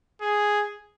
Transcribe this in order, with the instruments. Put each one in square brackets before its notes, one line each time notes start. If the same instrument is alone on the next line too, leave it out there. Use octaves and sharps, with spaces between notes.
[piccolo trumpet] G#4